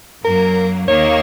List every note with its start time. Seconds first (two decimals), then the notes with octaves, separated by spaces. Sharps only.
0.24 F#2 F#3 A#3 A#4
0.88 D#2 D#3 A#3 C#5